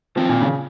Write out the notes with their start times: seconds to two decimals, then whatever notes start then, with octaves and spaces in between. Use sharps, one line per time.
0.16 D#3 F3 F#3 C4 F4
0.29 A#2
0.41 C#3